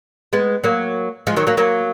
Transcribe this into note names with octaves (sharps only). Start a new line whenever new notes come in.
G#3 B3
F#3 A#3
F3 G#3
D#3 F#3
F#3 A#3
F#3 A#3